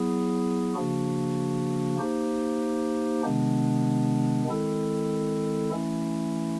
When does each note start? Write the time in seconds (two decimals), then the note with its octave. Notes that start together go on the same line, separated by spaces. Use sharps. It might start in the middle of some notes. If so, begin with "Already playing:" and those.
Already playing: F#3 B3 E4 G#4
0.75 C#3 F3 A#3 D4 F#4
1.99 A#3 D#4 G4 C5
3.23 C3 D#3 G#3 B3 D4
4.48 D#3 G#3 C4 E4 A4
5.71 E3 A3 C#4 E4